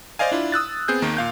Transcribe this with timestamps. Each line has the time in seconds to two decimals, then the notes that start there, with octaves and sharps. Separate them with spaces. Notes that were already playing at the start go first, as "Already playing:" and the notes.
0.19 C5 D5 D#5 F5 G#5
0.32 D4 E4 F4
0.52 D#6 E6 F#6 A6
0.88 B3 C4 G#4 G6
1.02 D#2 D#3 A#3
1.17 A#2 F5 G6